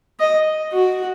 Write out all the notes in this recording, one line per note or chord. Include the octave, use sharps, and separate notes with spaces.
D#5
F#4